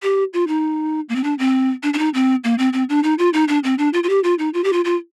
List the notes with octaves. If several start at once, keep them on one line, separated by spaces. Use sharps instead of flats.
G4
F4
D#4
A#3
C4
D4
C4
D4
D4
D#4
C4
A#3
C4
C4
D4
D#4
F4
D#4
D4
C4
D4
F4
F4
G4
F4
D#4
F4
G4
F4
F4